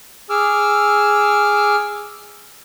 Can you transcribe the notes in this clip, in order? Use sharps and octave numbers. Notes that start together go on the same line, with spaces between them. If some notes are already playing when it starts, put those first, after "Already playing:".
G#4 D6 E6 F6